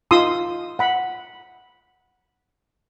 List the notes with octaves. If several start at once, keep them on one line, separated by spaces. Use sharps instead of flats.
D#4 F4 C6 D#6 E6
F#5 B5